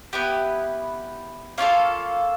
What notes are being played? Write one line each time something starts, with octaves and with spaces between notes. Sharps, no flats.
B3 E4 G4 B4
A#3 C#4 F4 A4 F5